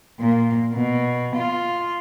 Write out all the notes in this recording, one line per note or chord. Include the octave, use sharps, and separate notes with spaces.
A#2
B2
F4